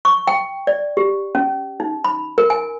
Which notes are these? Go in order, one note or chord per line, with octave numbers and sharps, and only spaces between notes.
C#6
G5
D5
G4
C#4
D#4
B5
A#4
G#5